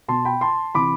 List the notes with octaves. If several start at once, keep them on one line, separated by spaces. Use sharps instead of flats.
B2 A5 C6
G5 B5
A5 C6
C3 E3 B5 D6